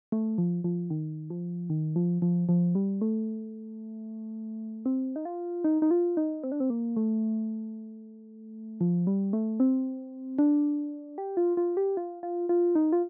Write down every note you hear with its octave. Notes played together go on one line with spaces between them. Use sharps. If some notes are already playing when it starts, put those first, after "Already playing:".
A3
F3
F3
D#3
F3
D#3
F3
F3
F3
G3
A3
C4
D#4
F4
D#4
D#4
F4
D#4
C4
D4
C4
A#3
A3
F3
G3
A3
C4
D4
G4
F4
F4
G4
F4
F4
F4
D#4
F4